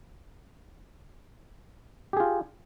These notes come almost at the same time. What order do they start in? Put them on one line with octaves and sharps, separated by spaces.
G4 G#4 F4